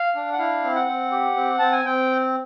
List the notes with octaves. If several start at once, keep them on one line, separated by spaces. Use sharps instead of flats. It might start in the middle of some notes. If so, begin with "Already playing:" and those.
Already playing: F5
D4
F#5
E4 F5
C4
F#5
C4
G4
C4
C4 A5
G#5
C4 G5